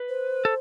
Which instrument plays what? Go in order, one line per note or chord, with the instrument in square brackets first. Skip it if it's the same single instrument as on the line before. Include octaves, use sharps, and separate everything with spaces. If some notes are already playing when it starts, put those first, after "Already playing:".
Already playing: [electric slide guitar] B4
[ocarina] C5
[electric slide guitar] A4